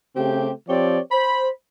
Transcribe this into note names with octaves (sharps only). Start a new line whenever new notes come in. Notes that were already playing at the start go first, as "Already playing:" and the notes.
C#3 A3 C4 G4
F3 C4 G4 C#5 D5
C5 B5